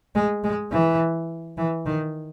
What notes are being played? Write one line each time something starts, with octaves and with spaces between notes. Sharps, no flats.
G#3
G#3
E3
E3
D#3